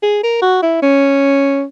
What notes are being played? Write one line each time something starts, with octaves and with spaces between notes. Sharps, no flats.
G#4
A#4
F#4
E4
C#4